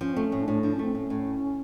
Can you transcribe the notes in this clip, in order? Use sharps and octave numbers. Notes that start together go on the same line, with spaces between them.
F3 C#4
A3 C4
C#4
A2
D4
A2
F3 D4
C#4
A3 C4
A2 C#4
A2